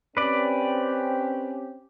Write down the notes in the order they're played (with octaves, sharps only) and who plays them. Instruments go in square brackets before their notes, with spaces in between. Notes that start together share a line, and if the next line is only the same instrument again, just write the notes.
[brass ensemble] C4 C#4 G4 [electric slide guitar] B4 D5